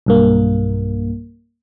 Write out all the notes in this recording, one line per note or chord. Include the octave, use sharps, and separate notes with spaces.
B1 G2 A#3